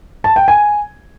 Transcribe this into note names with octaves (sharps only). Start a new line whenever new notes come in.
A5
G5
G#5